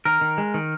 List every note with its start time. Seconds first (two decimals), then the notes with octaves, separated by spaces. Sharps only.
0.05 D#3 A#4
0.21 D#3
0.38 G#3
0.54 D#3